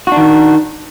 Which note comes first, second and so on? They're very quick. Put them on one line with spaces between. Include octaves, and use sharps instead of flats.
F#4 D4 D#3